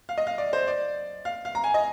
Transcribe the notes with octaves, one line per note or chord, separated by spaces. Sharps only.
F5
D#5
F5
D5
C5
D5
F5
F5
A#5
G#5
D#5